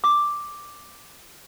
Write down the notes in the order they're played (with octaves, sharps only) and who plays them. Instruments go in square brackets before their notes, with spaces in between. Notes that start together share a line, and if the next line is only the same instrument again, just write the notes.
[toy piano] D6